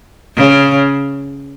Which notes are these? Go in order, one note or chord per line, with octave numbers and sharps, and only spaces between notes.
C#3